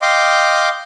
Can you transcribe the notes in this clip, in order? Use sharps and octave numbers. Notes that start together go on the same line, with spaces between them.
D#5 F5 G5 C6 D6